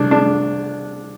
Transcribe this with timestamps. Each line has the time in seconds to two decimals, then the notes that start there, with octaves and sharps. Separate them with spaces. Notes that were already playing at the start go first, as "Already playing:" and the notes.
Already playing: C2 D4
0.11 D4